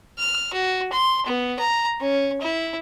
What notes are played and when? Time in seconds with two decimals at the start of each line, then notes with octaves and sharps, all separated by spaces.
0.19 F6
0.53 F#4
0.92 C6
1.26 B3
1.59 A#5
2.01 C#4
2.41 E4